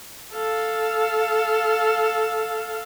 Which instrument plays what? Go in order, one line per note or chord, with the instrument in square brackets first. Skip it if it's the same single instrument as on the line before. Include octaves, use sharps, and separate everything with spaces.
[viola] A4 F5